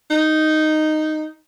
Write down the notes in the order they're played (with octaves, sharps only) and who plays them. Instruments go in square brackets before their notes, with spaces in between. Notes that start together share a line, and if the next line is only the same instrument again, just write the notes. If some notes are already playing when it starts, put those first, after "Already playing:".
[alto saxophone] D#4